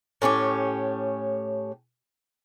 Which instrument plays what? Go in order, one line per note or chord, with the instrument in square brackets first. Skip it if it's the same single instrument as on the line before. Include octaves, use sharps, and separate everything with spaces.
[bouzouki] A2 C#4 D4 G4